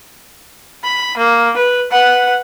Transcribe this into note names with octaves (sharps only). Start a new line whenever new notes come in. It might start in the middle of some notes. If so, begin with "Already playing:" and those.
B5
A#3
B4
B4 F#5